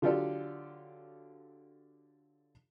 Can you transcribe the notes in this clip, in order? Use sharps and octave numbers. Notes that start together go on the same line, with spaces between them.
D3 F#3 F4 G4 A4 D5